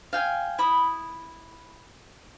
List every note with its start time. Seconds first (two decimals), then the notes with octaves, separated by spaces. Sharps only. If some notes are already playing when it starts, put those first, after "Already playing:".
0.13 F5 G5 G#5
0.58 E4 B5 D#6